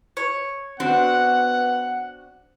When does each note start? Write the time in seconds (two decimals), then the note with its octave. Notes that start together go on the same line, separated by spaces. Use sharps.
0.17 C#5
0.80 B3 C4 D4 F#4 F#5